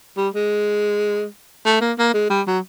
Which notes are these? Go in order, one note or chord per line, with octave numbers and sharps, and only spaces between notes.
G3
G#3
A3
A#3
A#3
G#3
G3
F#3